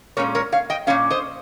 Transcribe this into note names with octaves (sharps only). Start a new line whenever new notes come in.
A#2 G#3 C#4 A#4 C#5
A#4 C#5
C#5 F5
D#5 G5
A#2 G#3 C#4 C#5 F5
C5 D#5